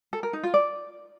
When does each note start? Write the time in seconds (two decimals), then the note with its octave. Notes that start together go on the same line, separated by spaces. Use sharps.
0.13 A4
0.23 A#4
0.33 D#4
0.43 F4
0.54 D5